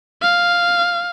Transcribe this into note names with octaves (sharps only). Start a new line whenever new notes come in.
F5